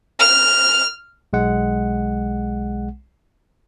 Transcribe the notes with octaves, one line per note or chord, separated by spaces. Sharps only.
F6
B1 G#3 F#5